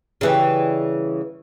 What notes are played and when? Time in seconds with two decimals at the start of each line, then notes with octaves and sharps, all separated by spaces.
0.21 C#3 E3 G3